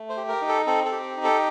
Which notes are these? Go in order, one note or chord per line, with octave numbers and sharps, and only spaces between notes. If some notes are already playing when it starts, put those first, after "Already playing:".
Already playing: A3
C5
G4
A#4
D#4
A4
C4 A4
A4
G4
D#4
A4